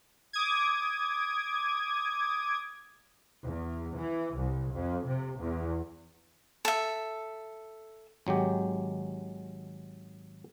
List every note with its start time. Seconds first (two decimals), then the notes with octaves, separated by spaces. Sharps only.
0.33 D6 D#6 G#6
3.44 E2
3.96 E3
4.36 C2
4.75 F2
5.06 C3
5.40 E2
6.65 A4 E5
8.27 G#1 F#3 G#3 G4